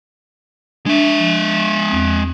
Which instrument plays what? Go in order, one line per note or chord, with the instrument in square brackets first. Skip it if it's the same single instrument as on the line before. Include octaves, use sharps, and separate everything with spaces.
[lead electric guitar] G#3 E5 [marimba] D4
[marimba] F3
E2 C4